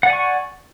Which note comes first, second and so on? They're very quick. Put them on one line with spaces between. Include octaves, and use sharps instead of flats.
F#5 D5 G#5 C#6